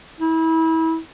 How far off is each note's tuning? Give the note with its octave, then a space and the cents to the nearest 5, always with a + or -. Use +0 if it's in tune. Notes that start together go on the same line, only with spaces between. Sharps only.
E4 -30